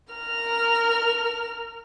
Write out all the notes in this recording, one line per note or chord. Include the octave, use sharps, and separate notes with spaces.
A#4 F6